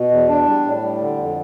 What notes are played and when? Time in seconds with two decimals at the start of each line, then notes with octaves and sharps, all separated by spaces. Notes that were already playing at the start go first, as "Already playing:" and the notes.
Already playing: B2
0.11 E2
0.29 D4
0.46 G3
0.64 A2
0.82 G3
1.00 D3
1.17 F2